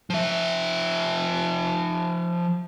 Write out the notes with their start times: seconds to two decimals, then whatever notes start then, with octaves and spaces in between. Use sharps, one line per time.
0.10 F3 E5